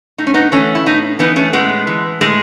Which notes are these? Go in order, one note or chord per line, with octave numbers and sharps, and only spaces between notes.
A2 D#4
C#4
B3 D#4
E3 A3 C#4
E4
A2 B3 D#4
E3 B3 D#4
A3 C#4
A2 G#3 B3
E3
A2 G#3